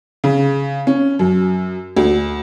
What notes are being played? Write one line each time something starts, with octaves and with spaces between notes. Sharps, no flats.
C#3
C#4
F#2
D2